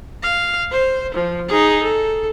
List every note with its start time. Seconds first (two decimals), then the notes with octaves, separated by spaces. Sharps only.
0.23 F5
0.72 C5
1.14 F3
1.48 D#4 G#4
1.83 A4